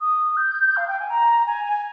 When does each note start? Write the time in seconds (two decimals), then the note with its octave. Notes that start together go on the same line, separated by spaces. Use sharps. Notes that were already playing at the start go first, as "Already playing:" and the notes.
0.01 D#6
0.37 G6
0.77 F5
0.88 G5
1.00 G#5
1.10 A#5
1.47 G#5
1.65 G#5